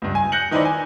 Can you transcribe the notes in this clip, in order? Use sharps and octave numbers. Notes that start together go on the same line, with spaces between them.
C#2 G2
G#5
F#6 G6 A#6 C#7 F#7
D#3 D#4 E4 B4 C5 D5
G#5